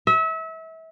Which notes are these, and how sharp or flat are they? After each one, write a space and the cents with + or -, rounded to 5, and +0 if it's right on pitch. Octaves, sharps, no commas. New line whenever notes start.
E5 -30